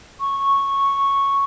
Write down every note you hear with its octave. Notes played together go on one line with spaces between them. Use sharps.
C#6